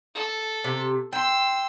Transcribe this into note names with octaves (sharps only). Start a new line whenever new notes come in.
A4
C3
G5 C6 E6